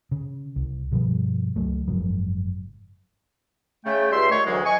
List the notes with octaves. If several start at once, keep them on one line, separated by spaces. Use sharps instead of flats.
C#3
C2
G2 B2 F3 G3
C#2 F#3 A3
F#1 G#2 F3 F#3
C#3 A3 G5
C#2 G3 E5 C6
D#3 A3 C#5
D2 D#3 E3 F#3 G#3
D#5 G#5 C#6